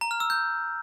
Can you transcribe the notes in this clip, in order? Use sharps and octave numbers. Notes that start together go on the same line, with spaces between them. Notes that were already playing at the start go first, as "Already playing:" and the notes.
A#5
F6
E6
G6